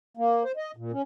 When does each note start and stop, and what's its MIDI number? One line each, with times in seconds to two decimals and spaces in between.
0.17 0.43 58
0.44 0.52 72
0.57 0.71 75
0.76 0.92 46
0.92 1.02 61